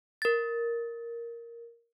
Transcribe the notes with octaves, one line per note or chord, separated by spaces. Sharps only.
A#4 A6